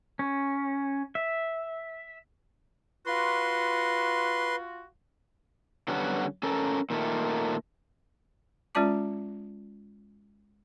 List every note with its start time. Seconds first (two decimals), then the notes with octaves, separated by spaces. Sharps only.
0.19 C#4
1.15 E5
3.06 F4 F#4 B4 C6
5.88 D3 F#3 G3 B3 C#4 F#4
6.43 C#4 A4 A#4
6.90 A#2 D#3 A3
8.75 G#3 C#4 F4 D5 A5 D6